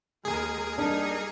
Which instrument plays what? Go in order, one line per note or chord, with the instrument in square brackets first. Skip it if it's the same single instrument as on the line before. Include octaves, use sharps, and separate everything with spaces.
[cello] D#2 [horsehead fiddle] G#3 A#4 [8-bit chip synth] G#4
[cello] G3 D#4 [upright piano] A#3 D4 [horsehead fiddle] A#4